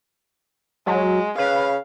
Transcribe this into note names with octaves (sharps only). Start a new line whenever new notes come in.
F#3 G#3
C#3 B4 F5